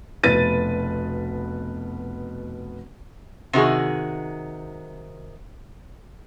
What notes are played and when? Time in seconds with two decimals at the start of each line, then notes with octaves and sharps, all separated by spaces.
0.23 F1 B2 B4 A6 D#7
3.53 C3 D#3 F#4 G#4